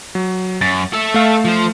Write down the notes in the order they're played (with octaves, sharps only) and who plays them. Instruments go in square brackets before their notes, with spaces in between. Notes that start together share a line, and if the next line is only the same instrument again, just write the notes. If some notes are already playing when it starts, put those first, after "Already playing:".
[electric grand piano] F#3
[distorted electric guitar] F#2 [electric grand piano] A6
[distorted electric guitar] A4 E5
[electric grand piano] A3 F5
[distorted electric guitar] F3 C5